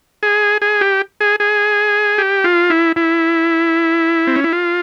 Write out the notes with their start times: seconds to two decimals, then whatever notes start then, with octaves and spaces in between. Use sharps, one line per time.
0.23 G#4
0.62 G#4
0.81 G4
1.21 G#4
1.40 G#4
2.18 G4
2.44 F4
2.70 E4
2.96 E4
4.27 C4
4.36 C#4
4.44 E4
4.53 F4